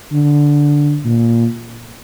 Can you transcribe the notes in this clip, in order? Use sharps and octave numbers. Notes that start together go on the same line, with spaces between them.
D3
A#2